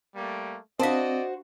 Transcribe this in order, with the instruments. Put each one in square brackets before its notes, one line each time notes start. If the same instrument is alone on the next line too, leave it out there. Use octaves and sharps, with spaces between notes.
[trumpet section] G3 A3 A#3
[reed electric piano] C4 [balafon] D4 F5 A5 [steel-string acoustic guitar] F#4 C5 [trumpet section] D5 D#5